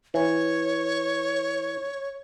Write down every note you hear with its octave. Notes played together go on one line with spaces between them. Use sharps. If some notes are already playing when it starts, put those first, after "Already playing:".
E3 C#5